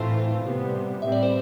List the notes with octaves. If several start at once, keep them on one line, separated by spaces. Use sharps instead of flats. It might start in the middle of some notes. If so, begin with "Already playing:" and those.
Already playing: A2 E3 A3 C4 F4 C5
C3 G3 B3
A2 G3 C4 E5
D5
C5